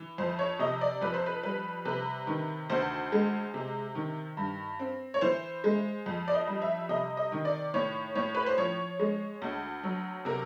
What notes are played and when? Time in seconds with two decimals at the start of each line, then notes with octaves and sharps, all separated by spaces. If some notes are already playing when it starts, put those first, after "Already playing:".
Already playing: E3
0.18 F2 C5
0.39 C#5
0.59 C3 D#5
0.81 D5
1.01 F2 B4
1.14 C5
1.26 B4
1.43 G3 B4
1.85 C3 B4
2.27 D#3
2.70 D2 C5
3.12 G#3
3.54 C3
3.95 D#3
4.37 G2
4.80 C4
5.14 C#5
5.21 E3 C5
5.64 G#3
6.06 F2
6.28 D5
6.34 D#5
6.48 G3
6.62 E5
6.89 C3 D#5
7.17 D#5
7.32 D#3
7.45 D5
7.74 A2 C#5
8.15 A2 C#5
8.35 B4
8.46 C5
8.57 F3 C#5
8.99 G#3
9.42 D2
9.83 F#3
10.25 C3 A#4